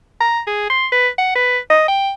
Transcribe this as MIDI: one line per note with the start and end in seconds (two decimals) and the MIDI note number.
0.21 0.41 82
0.47 0.68 68
0.70 0.87 84
0.92 1.08 71
1.18 1.31 78
1.35 1.58 71
1.70 1.84 75
1.88 2.11 79